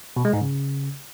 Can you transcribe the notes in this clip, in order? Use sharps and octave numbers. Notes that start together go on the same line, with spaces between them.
B2
G#3
G#2
C#3